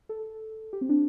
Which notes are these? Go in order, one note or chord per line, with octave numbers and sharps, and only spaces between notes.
A4
G4
C4
D4